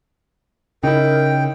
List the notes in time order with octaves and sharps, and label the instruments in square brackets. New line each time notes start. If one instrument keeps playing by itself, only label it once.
[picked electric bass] C#3 [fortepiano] D#4 E4 [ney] A#4 [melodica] G5